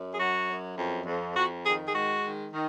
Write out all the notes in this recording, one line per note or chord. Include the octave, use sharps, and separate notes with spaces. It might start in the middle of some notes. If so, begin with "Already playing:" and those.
Already playing: F#2
G#4
F#3 F#4
F#2
F2
F2
F2 F#4
D#3 G#4
G#4
G#3 F#4
D#3
D#3